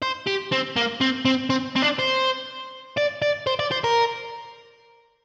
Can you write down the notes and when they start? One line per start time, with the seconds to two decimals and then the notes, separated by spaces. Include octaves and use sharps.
0.02 C5
0.27 G4
0.52 C4
0.76 A#3
1.01 C4
1.25 C4
1.50 C4
1.76 C4
1.83 D4
2.00 C5
2.98 D5
3.22 D5
3.47 C5
3.59 D5
3.72 C5
3.84 A#4